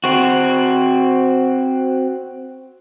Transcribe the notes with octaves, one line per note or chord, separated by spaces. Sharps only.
C4 F#4